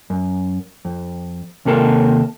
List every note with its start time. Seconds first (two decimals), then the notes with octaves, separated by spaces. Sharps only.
0.10 F#2
0.85 F2
1.65 D#2 C3 A#3 A4 A#4 A5